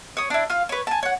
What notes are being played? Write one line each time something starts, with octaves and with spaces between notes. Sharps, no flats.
C#5 D#6
D4 E4
F4 F5
B4 C#5
G#5 A5
C#5 F#5